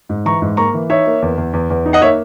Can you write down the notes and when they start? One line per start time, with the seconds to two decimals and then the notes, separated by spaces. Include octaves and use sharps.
0.09 G#2
0.25 E3 A#5 C#6
0.42 G#2
0.57 A#3 A#5 C#6
0.74 E3
0.89 D#4 C#5 E5
1.06 A#3
1.22 E2
1.38 E2
1.53 E2
1.70 E2
1.86 D#4
1.93 D#5 F#5
2.02 A#3 C#5 E5